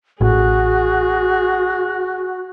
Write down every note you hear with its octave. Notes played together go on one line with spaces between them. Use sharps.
A1 F#4 G#4